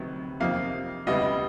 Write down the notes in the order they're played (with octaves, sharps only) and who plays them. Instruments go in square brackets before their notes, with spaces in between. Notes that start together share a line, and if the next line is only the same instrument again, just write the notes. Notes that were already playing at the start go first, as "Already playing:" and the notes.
Already playing: [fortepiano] D2 C3 D#3 F#3 B3
[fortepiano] F2 C3 F3 A#3 D#4 [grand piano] F5
[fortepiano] C#2 B2 G3 B3 E4 [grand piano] D#5